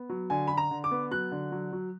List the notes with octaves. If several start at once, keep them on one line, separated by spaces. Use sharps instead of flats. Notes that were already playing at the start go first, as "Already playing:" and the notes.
Already playing: B3
F#3
D3 G#5
D3 B5
A#5
D3
D6
B3
F#3 F#6
D3
F#3
F#3